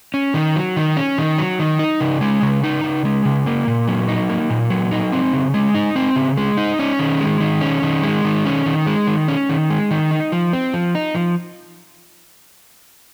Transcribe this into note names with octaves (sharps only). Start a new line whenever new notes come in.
C#4
D#3
F#3
D#3
C#4
D#3
F#3
D#3
D#4
C#3
G#3
C#3
D#4
C#3
G#3
C#3
A#3
A#2
F#3
D#4
A#3
A#2
F#3
D#4
C4
C#3
G#3
D#4
C4
C#3
G#3
D#4
C#4
D#3
G#3
D#3
C#4
D#3
G#3
D#3
C#4
D#3
G#3
D#3
C#4
D#3
G#3
D#3
D#4
F3
C4
F3
D#4
F3